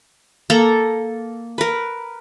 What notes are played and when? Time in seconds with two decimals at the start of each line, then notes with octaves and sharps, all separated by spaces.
0.50 A#3 A4 A#5
1.58 A#4 B4